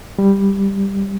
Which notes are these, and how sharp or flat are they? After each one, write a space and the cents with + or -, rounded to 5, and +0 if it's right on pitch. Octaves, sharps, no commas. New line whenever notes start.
G3 +5